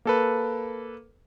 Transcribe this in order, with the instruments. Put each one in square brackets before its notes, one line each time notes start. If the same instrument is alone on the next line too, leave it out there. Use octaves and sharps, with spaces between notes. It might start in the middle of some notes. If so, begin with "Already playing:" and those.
[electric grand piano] A#3 A4 B4